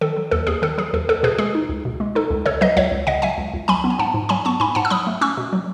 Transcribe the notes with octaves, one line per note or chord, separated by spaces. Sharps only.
D#3 A4
F#3
D#2 A4
D#2 G#4
D#3 A4
F#3 G#4
D#2 A4
D#2 A4
B2 G#4 B4
G#3 G#4
D#4
C#2
B2
G#3
D#4 A4
C#2
C#3 A4 C#5
F#3 B4 D#5
C#2 C#5 E5
C#2
C#3 D#5 F#5
F#3 E5 G#5
C#2
C#2
F#3 G#5 B5
B3
G#5
G#2 F#5 A5
G#2
F#3 G#5 B5
B3 A5 C#6
G#2 G#5 B5
G#2 F#5 A5
E6
F#3 B5 D#6
A3
C#4 C#6 E6
B2
F#3